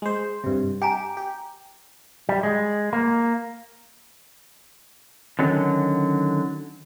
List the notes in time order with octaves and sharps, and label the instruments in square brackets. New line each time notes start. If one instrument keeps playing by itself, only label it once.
[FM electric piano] G#3 C5
G2 C3
[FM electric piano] G4 [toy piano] G5 G#5 A#5
[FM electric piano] G4
[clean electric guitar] G3
G#3
A#3
[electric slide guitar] D3 D#3 F#3 C#4